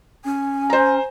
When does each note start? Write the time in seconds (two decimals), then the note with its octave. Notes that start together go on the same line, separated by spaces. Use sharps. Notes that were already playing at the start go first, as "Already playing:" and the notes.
0.25 C#4 G#5
0.70 C5 A#5